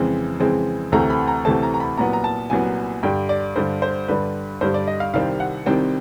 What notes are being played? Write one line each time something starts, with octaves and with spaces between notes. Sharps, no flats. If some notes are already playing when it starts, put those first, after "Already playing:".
Already playing: F2 C#3 E3 G#3 C4
F2 C#3 E3 G#3 C4
D2 C3 E3 A3 C4 A#5
B5
A#5
D2 C3 E3 A3 C4 A5
A#5
A#5
B5
C2 A#2 F#3 B3 A#5
A#5
A5
C2 A#2 F#3 B3 G#5
G2 D3 G3 G5
D5
G2 D3 G3 C5
C5
G2 D3 G3 B4
G2 D3 G3 C5
D5
D#5
F5
C2 C3 D#3 G3 C4 F5
F#5
C2 C3 D#3 G3 C4 G5